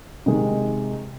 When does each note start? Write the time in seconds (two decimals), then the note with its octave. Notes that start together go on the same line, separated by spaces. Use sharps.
0.26 C3 D#3 G#3